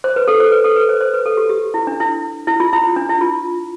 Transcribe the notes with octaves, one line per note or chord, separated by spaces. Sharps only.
C5
B4
A4
C5
B4
A4
B4
C5
C5
B4
A4
G4
G4
E4
D4
E4
E4
F4
E4
E4
D4
E4
F4